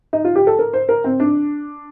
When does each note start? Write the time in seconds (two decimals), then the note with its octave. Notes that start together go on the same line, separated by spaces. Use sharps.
0.13 D#4
0.24 F4
0.35 G4
0.47 A4
0.59 A#4
0.73 C5
0.89 A#4
1.04 C4
1.20 D4